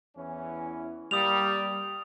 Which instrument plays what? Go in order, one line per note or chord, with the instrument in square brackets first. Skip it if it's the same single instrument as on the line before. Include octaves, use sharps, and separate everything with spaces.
[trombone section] E2 E3 C#4
[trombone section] G3 A#3 [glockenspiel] D#6 F7